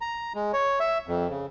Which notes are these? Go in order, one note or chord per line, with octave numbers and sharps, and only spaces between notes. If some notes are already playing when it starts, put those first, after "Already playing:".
A#5
G#3
C#5
E5
F2
C#3